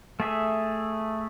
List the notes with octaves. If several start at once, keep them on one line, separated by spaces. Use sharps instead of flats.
A3 G#4 E5